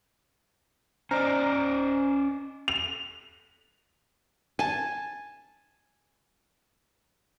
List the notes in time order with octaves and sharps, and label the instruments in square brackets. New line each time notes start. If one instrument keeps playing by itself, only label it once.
[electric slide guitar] C#4 D5 D#5 [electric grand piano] C5 A#5 F6
[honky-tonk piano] F7
[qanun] G#5 A5